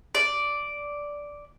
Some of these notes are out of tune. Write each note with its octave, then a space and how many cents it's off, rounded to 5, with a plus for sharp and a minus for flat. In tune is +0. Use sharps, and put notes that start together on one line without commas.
D5 -5